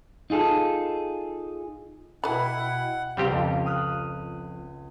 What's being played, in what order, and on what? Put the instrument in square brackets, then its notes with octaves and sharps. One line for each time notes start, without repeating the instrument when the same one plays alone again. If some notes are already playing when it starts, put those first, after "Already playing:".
[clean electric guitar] D#4 F4 G#4 A4
[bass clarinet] B2 [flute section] E4 G5 [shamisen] B4 B5 [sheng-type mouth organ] F#5
[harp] C#2 F5 [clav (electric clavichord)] G3 C4 G4
[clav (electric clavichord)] F2
[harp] D#6 F6 F#6